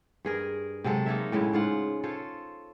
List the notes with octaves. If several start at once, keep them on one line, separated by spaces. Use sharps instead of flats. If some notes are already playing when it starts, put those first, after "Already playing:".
G2 G#4 A#4
C3 F#3 G#3 A4
A#3 D#4 C#5 E5
A2 C#3 G#3 E4
G#2 F4 F#5
F4 A4 C5 C#5